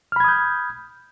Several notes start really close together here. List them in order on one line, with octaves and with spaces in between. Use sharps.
F6 B5 G#6 D#6 G6